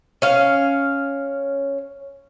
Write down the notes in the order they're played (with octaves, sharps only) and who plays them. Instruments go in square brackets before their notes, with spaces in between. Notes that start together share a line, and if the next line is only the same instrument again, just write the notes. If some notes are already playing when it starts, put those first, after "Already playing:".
[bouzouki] C#4 F5